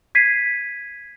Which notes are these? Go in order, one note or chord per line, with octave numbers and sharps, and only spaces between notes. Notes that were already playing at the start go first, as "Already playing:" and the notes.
G#6 B6 C7 D#7